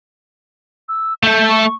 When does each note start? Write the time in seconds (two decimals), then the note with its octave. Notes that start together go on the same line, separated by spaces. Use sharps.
0.89 E6
1.23 A3 A4 G6
1.49 C#6